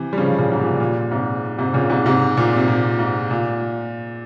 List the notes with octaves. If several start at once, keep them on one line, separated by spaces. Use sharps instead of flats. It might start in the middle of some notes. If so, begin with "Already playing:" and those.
Already playing: C3 E3
G3
C#3 F3
A#2 C#3
G#2
A#2
A#2
G#2 C3
G#2 C3
A#2 C#3
G#2 C3
G#2 C3
A#2
C3
A#2
G#2
A#2